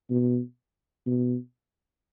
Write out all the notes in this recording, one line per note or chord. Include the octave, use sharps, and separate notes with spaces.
B2
B2